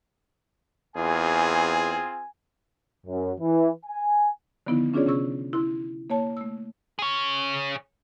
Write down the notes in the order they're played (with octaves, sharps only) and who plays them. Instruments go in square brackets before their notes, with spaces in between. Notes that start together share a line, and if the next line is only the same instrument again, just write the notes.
[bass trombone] E2 [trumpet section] C4 F4 G#4 [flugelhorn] G#5
[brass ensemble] F#2
E3
G#5
[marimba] D3 D#3 F3 B3 D#4 E4
C#4 D4 F4 G#4 C#5 D5
C3 C#4 G#4 C#6 E6
E4 C6
A#3 C#5 A5
A3 E6
[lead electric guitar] G#4 C#5